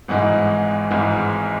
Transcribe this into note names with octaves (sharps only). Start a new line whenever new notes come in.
G#1 G#2 E3 G#3 F#5
G#1 G#2 E3 G#3